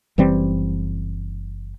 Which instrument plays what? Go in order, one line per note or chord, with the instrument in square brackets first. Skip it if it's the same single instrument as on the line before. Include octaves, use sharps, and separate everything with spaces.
[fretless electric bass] F#1 E3 G3 C4